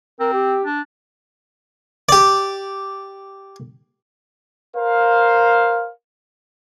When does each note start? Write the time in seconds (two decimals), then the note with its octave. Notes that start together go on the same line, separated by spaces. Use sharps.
0.20 C4 A#4
0.33 G4
0.64 D4
2.09 G4 D5
4.77 A#4 C5 F5